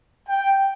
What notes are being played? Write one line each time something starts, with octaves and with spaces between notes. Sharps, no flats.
G5